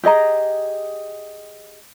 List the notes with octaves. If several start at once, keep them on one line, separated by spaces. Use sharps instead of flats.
G4 G#4 D#5 A#5